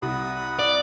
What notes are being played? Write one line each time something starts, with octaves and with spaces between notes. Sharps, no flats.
C2 F#5 B5 D#6
D5